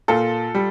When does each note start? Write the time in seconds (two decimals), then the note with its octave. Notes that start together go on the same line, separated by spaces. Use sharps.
0.08 A#2 F4 A4
0.54 G3